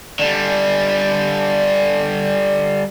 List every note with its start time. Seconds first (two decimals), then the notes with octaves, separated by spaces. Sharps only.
0.19 D3 G3